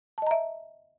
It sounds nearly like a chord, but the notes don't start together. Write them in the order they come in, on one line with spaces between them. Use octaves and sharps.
A5 D#5 A#5 E5